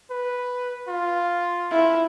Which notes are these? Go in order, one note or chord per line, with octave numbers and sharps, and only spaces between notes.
B4
F4
E4